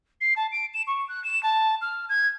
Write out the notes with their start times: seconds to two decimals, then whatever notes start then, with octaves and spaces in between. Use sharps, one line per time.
0.21 C7
0.36 A5
0.52 D7
0.74 E7
0.87 C#6
1.09 F#6
1.24 E7
1.43 A5
1.82 F6
2.09 G#6